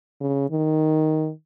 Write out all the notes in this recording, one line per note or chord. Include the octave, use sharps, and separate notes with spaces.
C#3
D#3